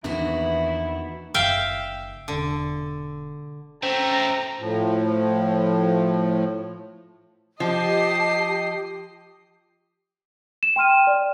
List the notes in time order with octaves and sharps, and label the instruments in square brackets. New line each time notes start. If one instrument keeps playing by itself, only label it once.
[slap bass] E2 A#3 D4 [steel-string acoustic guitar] D#3 B3 F#4 [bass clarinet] E3 [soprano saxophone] E4
[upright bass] F#1 D#3 [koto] E5 F5 G5
[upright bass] E1 [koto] D3
[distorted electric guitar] A3 C4 [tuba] C#4 [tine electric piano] C5 G5 [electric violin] A#5
[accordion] A2 F3
[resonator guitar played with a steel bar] F3 [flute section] G4 [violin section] D#5 C7 [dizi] A5
[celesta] E7
G5 C6 F6 D#7
D5